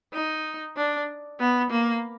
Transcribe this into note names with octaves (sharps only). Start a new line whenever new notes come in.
D#4
D4
B3
A#3